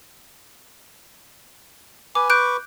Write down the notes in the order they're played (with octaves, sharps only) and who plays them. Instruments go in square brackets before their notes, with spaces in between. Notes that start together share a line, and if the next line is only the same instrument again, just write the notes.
[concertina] B4 G#5 [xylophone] D6
[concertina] B4 C#6 D6 [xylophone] F#6 G6 D7